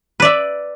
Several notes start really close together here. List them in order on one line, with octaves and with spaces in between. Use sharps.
B4 D5 E5